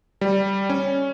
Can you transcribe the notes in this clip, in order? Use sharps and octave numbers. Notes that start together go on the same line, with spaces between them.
G3
C#4